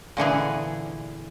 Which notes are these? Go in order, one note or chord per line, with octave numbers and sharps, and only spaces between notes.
A#2 D3 E3 G#4